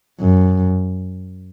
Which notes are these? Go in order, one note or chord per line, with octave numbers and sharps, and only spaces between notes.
F#2